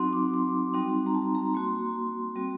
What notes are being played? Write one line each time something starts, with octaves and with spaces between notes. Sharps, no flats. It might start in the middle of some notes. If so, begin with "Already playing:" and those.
Already playing: F#3 C4 D#4 F#4 C6
D6
C6
G3 C4 D#4 F#4
A#5
A5
A#5
A#3 F#4 C6
G3 C4 F#4